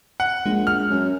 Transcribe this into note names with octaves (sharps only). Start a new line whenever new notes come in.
F#5
A#1 G#3
F6
F#2